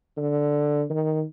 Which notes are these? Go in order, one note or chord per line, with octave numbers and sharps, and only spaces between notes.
D3
D#3